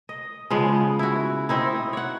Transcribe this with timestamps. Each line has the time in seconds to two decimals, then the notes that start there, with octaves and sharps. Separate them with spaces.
0.09 D#5
0.50 C#3 F3 G#3 B3
0.99 E4 F#4
1.49 C4 D#4 E4
1.93 C#5 F#5